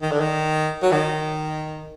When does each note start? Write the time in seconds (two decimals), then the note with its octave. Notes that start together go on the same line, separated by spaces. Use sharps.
0.02 D#3
0.11 D3
0.20 D#3
0.82 F#3
0.91 D#3